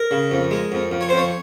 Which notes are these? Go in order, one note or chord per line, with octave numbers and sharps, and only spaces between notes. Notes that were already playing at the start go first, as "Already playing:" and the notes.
Already playing: A#4
C#3
F2
G#3
F2
F2
C#5
C5
F2 C#5